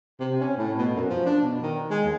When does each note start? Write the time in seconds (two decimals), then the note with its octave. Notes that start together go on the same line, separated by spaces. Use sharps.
0.20 C3
0.41 C#4
0.57 A2
0.78 B2
0.95 F#2
1.09 F3
1.25 D4
1.42 B2
1.62 D#3
1.90 G#3
2.04 D#2